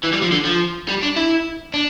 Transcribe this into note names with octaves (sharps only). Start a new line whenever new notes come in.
E3
G3
F3
D3
F3
G3
D4
E4
D4